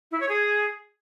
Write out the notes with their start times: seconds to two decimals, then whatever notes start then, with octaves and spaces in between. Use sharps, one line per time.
0.11 E4
0.20 C#5
0.29 G#4